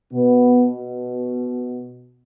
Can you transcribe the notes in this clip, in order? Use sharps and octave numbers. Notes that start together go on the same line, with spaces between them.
B2 B3